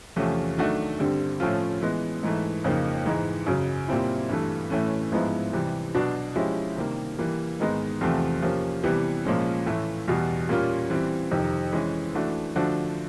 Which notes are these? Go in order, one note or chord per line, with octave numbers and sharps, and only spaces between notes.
E2 C3 F3 A3 C#4
D#3 F#3 A3 D4 F#4
G2 D3 G3 C4
A2 F3 A3 C#4 F4
E3 G#3 B3
G#2 E3 A3
F2 C#3 F3 A#3 D#4
G#2 E3 G#3
F#2 C#3 F#3
A#2 G3 C4 E4
G2 E3 A3
A2 E3 A3 C#4
G#2 F3 G#3 B3 E4
C3 E3 G3
B2 F#3 B3 D4 F#4
F3 G#3 C#4 E4 G4
C3 D#3 G3 A#3
E3 G3 A#3
G#2 D#3 G#3 B3 D#4
E2 C3 F3 A3 C4
C3 F3 A#3 C#4
C3 E3 G3 B3
A#2 F3 G#3 C#4
A2 E3 A3
E2 B2 G3
A#2 G3 A#3 C#4 F4
E3 G3 C4
F2 C3 D#3
E3 G#3 C#4
E3 A3 D4 F#4
D3 F3 A3 D4 F#4